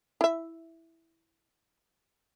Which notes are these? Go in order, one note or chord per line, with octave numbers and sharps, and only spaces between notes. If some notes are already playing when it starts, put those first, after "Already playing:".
E4 E5